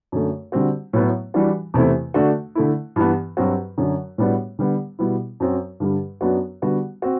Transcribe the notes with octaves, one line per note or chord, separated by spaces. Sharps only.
F#2 D3 A3
D3 G3 C4 F#4
A2 F#3 B3 E4
E3 G3 D4 F#4
E2 C3 E3 A3 E4
D3 A3 D4 F#4
D3 A3 E4
G2 E3 B3
G2 F#3 C4 F#4
F#2 D3 F#3
A2 G3 B3 D4 F#4
D3 G3 B3
B2 G3 B3 E4
F#2 F#3 C4 F#4
G2 D3 G3
F#2 F#3 B3 D4 F#4
D3 G3 B3 F#4
C4 F#4